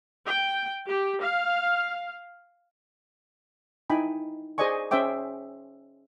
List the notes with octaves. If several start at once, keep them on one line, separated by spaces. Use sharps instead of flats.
G5
G4
F5
D#4 E4 G5 G#5 B5
G#4 C5 D5 D#5 G#5 C#6
C#4 G#4 C5 E5 G5 D6